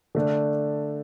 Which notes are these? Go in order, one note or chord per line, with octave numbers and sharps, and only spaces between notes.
D3 A3 D4